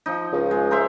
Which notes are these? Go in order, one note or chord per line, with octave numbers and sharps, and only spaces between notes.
F3 D#4
C#2
G#3
A#4 C5 E5